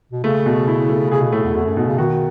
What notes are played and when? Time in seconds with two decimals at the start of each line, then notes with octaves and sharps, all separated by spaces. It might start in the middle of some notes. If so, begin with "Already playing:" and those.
0.12 B2
0.24 C#3 A3
0.46 B2
0.68 E4
0.89 A3
1.11 C#3 G#4
1.22 B2
1.32 A2 A3
1.44 E2
1.54 E2 A3
1.66 F#2
1.77 G#2 B2
1.87 C#3
1.98 D#3 F#4